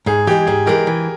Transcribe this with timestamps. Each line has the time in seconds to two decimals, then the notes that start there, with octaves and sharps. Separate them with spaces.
0.06 G#2 G#4
0.27 E3 G#3 G4
0.47 G#2 G#4
0.66 E3 G#3 G4 A#4
0.87 E3